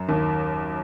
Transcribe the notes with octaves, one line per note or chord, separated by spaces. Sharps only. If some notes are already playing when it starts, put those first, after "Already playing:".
Already playing: F#2 F#3
D#2 D#3